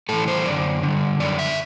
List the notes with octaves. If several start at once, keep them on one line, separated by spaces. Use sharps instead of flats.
A2 E3 A4
C5
F#2 D3 D5
G2 D3
F#2 D3 D5
E5